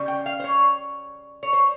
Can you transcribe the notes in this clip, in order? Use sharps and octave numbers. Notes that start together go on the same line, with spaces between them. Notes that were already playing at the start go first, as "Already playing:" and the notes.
Already playing: C#3 G3 C#4
G5
F5
C5
C#5
C#5
C5